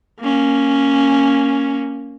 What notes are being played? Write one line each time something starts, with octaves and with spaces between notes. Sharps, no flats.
A#3 C#4